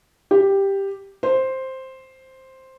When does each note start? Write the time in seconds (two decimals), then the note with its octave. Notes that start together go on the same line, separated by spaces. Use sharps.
0.31 G4
1.23 C5